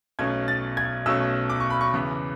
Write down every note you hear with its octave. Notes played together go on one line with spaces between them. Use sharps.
B1 B2 A3 C#4 G#6
A6
G#6
B1 B2 A3 C#4 E6
D6
C#6
B5
C#6
E2 C#3 E3 B3 B5